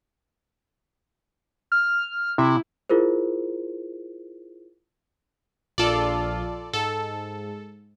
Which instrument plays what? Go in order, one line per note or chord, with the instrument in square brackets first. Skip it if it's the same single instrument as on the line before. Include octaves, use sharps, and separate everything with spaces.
[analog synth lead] F6
[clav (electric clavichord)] C3 [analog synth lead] E4
[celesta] E4 F4 G#4 A#4 C5
[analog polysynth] A#1 F4 [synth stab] A4 D5
[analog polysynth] G#2 [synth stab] A4